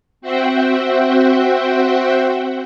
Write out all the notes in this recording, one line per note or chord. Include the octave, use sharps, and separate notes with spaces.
C4 F#4 C5 E5 F#5 G5